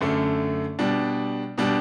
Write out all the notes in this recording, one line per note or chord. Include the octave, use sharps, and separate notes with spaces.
F#2 D3 A3
B2 G3 D4
B2 G3 D4 G4